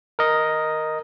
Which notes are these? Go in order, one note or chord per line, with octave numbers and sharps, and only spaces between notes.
A#4 D#5